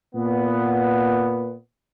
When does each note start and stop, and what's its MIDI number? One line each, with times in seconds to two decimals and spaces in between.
0.15 1.56 46
0.15 1.56 59